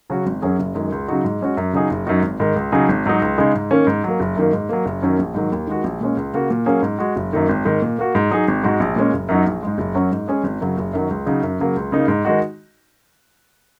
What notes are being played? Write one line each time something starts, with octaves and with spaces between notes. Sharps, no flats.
C#3 F#3 C#4 F#4
G#1
F#2 F#3 C#4 G#4
F#1
F#2 D#3 G#3
C#2
C#3 F#3 D#4 F#4
G#2
G#3 C#4 F#4
F#2
C#3 F#3 D#4 G#4
F#1
F#2 F#3 D#4 F#4
G#1
G#2 D#3
C#2
C#3 F#3 D#4 G#4
G#1
G#2 F#3 D#4
C#2
C#3 G#3 D#4 G#4
G#2
D#3 A#3 C#4
G#2
F#3 A#3
F#1
F#2 D#3 A#3
G#2
F#3 A#3
F#1
F#2 D#3 F#3 C#4
A#1
G#2 D#3 F#3
D#2
D#3 G#3 F#4
A#1
A#2 G#3 C#4
C#2
C#3 A#3 F#4
A#2
F#3 A#3 C#4 G#4
G#2
G#3 F#4
F#1
F#2 D#3 A#3
G#1
G#2 D#3
A#2
A#3 F#4
G#2
F#3 D#4 G#4
G#1
G#2 G#3 F#4
A#1
A#2 G#3 C#4
F#1
F#2 F#3 D#4 F#4
A#1
G#2 G#3
F#1
F#2 F#3 C#4 F#4
G#2
G#3 C#4 G#4
G#1
F#2 C#3 F#3
F#1
F#2 D#3 F#3
C#2
C#3 F#3 D#4
F#2
C#3 F#3 A#3
C#2
C#3 A#3 D#4
G#2
D#3 G#3 D#4 F#4